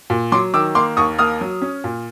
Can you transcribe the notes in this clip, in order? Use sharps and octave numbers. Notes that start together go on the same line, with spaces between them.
A#2
F#3 C6 D6
D#3 D6 E6
A#3 C6 D6
D#2 C#6 D#6
A#3 D#6 F6
F#3
C#4
A#2